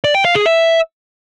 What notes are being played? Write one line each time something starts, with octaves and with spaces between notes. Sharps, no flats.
D5
G5
F5
G#4
E5